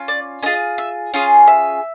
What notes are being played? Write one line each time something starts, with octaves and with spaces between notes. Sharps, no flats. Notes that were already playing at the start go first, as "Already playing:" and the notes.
Already playing: C#4 F4
D5
C#4 F4 G#4 D#5
E5
C#4 F4 G#4 F5
E5